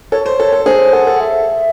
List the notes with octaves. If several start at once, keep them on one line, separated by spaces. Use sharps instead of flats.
A4 C#5
C5
A4
A4
G#4 C5
A4 F#5
A4
E5